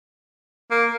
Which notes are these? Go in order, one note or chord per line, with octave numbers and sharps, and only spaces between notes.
A#3